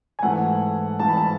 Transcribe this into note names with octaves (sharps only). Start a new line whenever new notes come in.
G#5
G#2 E3 A3 F#5
G#2 E3 A3 A5
B5
A5